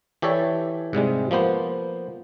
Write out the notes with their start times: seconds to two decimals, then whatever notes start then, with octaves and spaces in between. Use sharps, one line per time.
0.22 E3 G4 A4 C#5 D5 E5
0.93 G#2 C3 G3 G#3
1.31 F3 A#3 B3 C5